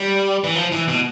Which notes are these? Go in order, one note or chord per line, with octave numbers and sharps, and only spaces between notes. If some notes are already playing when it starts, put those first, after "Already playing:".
Already playing: G3
E3
F3
E3
B2